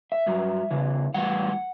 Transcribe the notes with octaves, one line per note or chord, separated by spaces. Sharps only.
E5
G2 F#3
E2 C#3 E3
A2 E3 G3 F#5